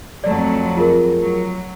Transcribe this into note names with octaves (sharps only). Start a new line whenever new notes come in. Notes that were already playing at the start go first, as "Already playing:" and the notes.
F2 F#3 A3 D5
F4 G#4 A#4
F#3